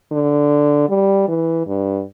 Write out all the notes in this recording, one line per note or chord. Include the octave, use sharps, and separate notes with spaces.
D3
G3
E3
G2